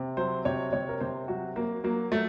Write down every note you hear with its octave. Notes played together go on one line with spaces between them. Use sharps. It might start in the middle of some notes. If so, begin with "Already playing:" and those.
Already playing: C3
F#3 C5
C3 C#5
C3 C#5
A#4
C3 C5
F#3 F#4
F#3 A#3
F#3 A#3
F#3 A3